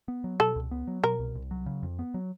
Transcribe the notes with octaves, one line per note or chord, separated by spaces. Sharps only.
B3
F#3
B2 A4
C#2
B3
F#3
B2 A#4
C2
C2
F#3
C#3
F2
B3
F#3